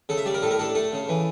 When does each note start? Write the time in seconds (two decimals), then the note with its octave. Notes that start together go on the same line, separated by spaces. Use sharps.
0.09 C#3 A4
0.17 E5
0.25 G3 D5
0.34 A#4
0.42 A2 A4
0.51 A#4
0.59 D4 A4
0.75 A3 A4
0.93 C#3
1.09 E3